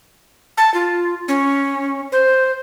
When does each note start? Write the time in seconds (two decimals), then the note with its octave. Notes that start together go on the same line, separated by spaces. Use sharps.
0.57 A5
0.74 F4
1.28 C#4
2.12 C5